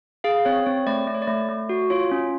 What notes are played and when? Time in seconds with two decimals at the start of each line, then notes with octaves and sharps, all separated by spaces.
0.24 G#4 F5
0.45 C4 C#5
0.66 C4 C#5
0.87 A3 D5
1.07 A3 D5
1.15 C#5
1.22 D5
1.27 A3
1.49 A3
1.69 F#4
1.90 F4 C#5
2.11 C#4